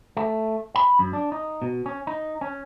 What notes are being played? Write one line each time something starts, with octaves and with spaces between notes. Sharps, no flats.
A3
B5
F#2
D4
D#4
B2
C#4
D#4
C#4